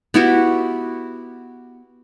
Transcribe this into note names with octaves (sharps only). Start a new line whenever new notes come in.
B3 E4 F#4 G4